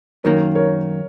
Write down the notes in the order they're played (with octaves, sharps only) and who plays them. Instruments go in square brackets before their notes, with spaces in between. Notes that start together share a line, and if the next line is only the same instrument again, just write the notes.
[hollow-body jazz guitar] F#2 D#3 A#3 [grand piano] A#4 C#5
[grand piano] A#4 C#5